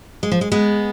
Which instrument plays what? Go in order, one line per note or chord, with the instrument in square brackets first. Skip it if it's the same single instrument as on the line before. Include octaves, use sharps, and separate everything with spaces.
[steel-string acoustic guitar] G#3
F3
G#3
G#3 B3